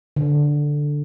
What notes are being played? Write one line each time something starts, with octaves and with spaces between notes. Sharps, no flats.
D3